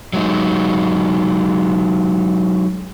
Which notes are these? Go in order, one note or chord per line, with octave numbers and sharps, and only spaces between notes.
F#3 G#3 D#4